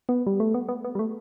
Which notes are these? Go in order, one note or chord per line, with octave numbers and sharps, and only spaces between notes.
B3
G3
A3
B3
B3
B3
G3
A3